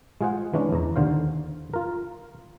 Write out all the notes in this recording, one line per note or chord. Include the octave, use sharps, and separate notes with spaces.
G#3 F4 G#4 C5 F#5
E3 G#3 C#4 D4
E2 A#5
D#2 D3 C5 F5
F4 A#4